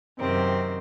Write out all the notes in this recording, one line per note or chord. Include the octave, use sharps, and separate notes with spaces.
F#2 C3 D#3 C4